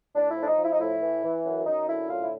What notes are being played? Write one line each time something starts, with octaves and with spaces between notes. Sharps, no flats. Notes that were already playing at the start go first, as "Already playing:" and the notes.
A2 D4
E4
F3 D4
D#4
F3
E4
D#4
A2 E4
E3
E3
F#2
F#2 D#4
D3 E4
A2 F4
E4